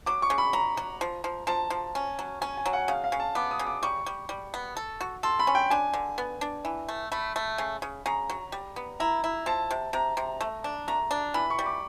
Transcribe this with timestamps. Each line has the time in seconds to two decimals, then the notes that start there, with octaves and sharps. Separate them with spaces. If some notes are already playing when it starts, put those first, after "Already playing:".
0.06 F#3 D6
0.22 C#6
0.30 C#3
0.38 B5
0.53 F#3 A#5
0.77 F#3
1.01 F3
1.24 F3
1.47 F3 A5
1.70 F3
1.95 C#4
2.19 F#3
2.41 C#4 G#5
2.57 G#5
2.66 F#3
2.73 F#5
2.88 C#3 F5
3.04 F5
3.12 C#3
3.20 A5
3.35 B3 D6
3.51 D#6
3.59 C#3
3.67 D6
3.83 G3 C#6
4.06 G3
4.29 G3
4.54 B3
4.77 A4
5.01 F#4
5.23 A4 C6
5.39 B5
5.47 C#4
5.55 G5
5.70 D4 G#5
5.94 D3
6.18 B3
6.41 D4
6.65 E3
6.89 A3
7.12 A3 B5
7.36 A3
7.58 C#3
7.82 C#3
8.06 C#3 A#5
8.30 F#3
8.52 G3
8.76 B3
9.00 E4 A#5
9.24 E4
9.46 F3 A5
9.71 C3
9.93 C3 A#5
10.17 C3
10.41 A3
10.64 D4
10.88 A3 A#5
11.11 D4
11.34 E3 B5
11.50 C#6
11.59 G3
11.66 D6